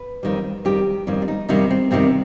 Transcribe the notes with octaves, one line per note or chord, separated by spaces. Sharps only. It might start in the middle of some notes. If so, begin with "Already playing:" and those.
Already playing: B4
F2 D#3 G3
F2 D#3 G3 G4
F2 D#3 G3
D4
D#4
F2 C3 D#3 G3 D#4
C4
F2 C3 D#3 G3 C4